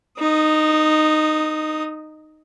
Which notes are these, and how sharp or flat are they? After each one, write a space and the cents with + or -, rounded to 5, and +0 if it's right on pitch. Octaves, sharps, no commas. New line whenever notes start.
D#4 -10 D#6 +10